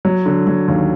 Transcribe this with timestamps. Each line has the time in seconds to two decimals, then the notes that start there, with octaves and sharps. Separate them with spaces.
0.05 F#3
0.26 D3
0.47 F#3
0.68 D#2